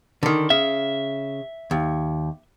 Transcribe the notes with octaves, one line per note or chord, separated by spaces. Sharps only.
D3 D#3
C#3 E5
D#2